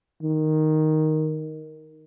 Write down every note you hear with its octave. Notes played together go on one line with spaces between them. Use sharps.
D#3